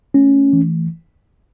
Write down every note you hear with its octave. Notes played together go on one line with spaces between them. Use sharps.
A3 C#4
E3